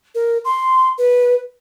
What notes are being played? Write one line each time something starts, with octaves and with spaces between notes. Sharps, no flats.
A#4
C6
B4